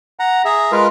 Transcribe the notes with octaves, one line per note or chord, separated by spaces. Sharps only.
F#5 A#5
G#4 E5 A#5
G#3 F4 A#4 B4 F5